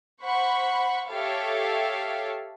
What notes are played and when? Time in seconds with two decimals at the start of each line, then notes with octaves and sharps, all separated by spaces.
0.22 C5 F#5 B5 C#6
1.08 G4 A4 C#5 E5 F5